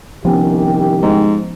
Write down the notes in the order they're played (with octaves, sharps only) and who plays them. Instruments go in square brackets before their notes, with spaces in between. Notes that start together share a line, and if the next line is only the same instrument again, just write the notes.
[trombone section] C2 D#3 G4 [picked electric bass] F3 B3 C#4
[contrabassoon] G#2